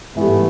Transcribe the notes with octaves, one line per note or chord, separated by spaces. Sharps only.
G#2 E3 G3 A3 B3